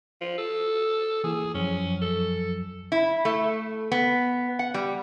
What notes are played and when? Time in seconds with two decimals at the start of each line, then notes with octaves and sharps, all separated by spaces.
0.21 F3
0.38 A4
1.24 E3 A#3 E4 G#4
1.54 F#2 F3 F#3 C#4
2.02 A4
2.92 E4
3.25 A3
3.92 B3
4.59 F#5
4.74 G3